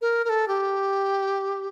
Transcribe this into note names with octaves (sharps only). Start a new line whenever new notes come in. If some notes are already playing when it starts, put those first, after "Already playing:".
A#4
A#4
A4
G4